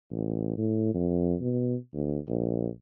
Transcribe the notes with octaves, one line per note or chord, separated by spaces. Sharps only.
A1
A2
F2
B2
D2
A#1